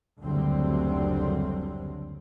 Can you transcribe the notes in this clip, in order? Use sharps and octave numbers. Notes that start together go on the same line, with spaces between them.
F#1 D2 D3 F#3 G3 C4